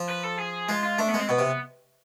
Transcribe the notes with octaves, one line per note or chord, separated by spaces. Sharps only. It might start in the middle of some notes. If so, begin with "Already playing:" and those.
Already playing: F3
B4
A4
G#4
G#3 F4
F4
A3 D4
B3
G#3
C4
B2 B3
C3